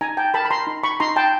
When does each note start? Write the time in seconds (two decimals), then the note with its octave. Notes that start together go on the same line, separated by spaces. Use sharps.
0.01 D#4 G#5 A#5
0.17 G5 A5
0.34 A#4 A5 B5
0.45 B5
0.51 A#5 C6
0.67 D#4
0.84 B5 C#6
1.00 D#4 A#5 C6
1.16 G5 A5